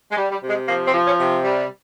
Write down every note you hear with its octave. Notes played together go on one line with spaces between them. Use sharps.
G#3
G3
G3
C3
G#3
F3 A#3
C4
F3
C#4
C3
G3